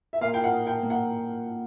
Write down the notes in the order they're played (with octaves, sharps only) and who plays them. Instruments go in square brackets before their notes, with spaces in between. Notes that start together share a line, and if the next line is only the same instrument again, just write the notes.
[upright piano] E5
[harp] A#2 [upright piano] F5
[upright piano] G5
F#5
[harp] D#4
[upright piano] G5
[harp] A#3
[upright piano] F#5